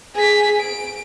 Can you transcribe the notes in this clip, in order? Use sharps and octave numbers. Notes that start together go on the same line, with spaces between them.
G#4 B6
D7